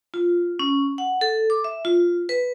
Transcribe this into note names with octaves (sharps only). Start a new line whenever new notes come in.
F4
C#4
F#5
A4
D6
E5
F4
B4